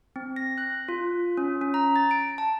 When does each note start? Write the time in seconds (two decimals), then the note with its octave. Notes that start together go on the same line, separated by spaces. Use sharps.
0.16 C4
0.36 A#6
0.58 F#6
0.89 F4
1.37 C#4
1.61 C#4
1.74 A#5
1.96 A6
2.11 D7
2.38 A5